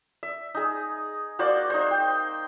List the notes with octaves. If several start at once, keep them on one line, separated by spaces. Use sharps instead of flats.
E5
D#4 G#4
A#3 F#4 C5 D5
D#4 C5
G5